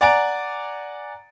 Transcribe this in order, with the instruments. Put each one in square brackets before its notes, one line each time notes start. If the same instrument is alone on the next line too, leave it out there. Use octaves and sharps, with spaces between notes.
[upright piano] D5 F#5 G#5 A#5 A6 D7